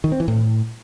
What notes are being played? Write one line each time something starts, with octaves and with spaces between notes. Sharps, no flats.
D#3
C4
E3
A2